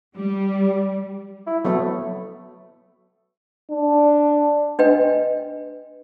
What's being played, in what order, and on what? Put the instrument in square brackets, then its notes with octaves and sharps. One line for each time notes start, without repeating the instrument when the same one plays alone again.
[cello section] G3
[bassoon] E4
[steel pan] F#3 B3 [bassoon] A3
[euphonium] D4
[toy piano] D4 B4 D#5 G5